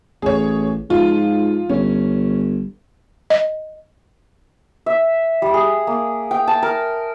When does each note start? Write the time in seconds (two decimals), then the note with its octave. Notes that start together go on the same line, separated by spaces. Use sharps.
0.22 A1 G#4 C#5
0.90 G#2 F3 F4
1.70 G1 C#4
3.30 D#5
4.86 E5
5.42 G3
5.54 G#4
5.87 A#3
6.31 G5
6.48 A5
6.63 A#4